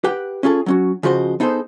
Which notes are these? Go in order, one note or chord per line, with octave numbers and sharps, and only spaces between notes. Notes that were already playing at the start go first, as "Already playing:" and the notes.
G4 B4 F#5 G5
C#4 F4 G#4 A4
F#3 C#4 F#4
C#3 F3 F#4 C5 D#5
B3 D#4 G#4 A4 C5